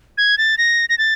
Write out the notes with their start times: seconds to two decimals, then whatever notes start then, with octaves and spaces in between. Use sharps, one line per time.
0.18 G#6
0.38 A6
0.58 A#6
0.89 A#6
0.98 A6